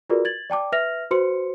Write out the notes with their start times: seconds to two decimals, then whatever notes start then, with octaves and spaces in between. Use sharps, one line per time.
0.10 F4 F#4 G#4 A#4 B4 D5
0.25 G#6 A6 F#7
0.50 D5 G5 A5 D6
0.72 B4 E5 F6 A#6 F7
1.11 F#4 B4 C5 C6 C#7